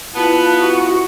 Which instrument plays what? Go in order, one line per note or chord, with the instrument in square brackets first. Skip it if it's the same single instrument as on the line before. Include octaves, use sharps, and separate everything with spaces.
[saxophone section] B3 [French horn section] E4 F4 [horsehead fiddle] A5
[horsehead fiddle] F#4